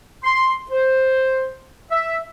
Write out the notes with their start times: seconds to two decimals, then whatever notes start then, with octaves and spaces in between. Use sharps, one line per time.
0.24 C6
0.71 C5
1.91 E5